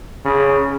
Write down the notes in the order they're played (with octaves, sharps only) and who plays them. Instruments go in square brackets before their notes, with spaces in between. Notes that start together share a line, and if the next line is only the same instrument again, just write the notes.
[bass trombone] C#3